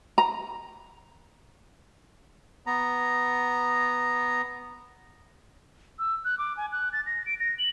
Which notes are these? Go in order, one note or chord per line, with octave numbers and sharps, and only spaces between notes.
A#5
B3 A#5
E6
F#6
D6
G#5
F#6
A6
A#6
D7
A#6
F#7